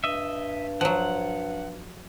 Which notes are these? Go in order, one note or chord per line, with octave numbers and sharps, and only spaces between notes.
G2 D#5 E5
F3 F#3 F#5